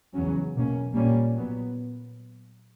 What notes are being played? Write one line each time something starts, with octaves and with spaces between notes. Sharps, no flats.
E2 C#3 F#3 C#4
B2 A#3 C#4
A#2 G3 A#3 C#4
A#2 F#3 B3